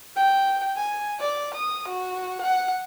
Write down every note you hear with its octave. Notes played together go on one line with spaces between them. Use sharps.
G5
G#5
D5
D#6
F#4
F#5